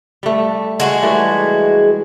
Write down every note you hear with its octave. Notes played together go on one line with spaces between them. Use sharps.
G3 A3
G#3 F#4 G#4
E3 G3 A3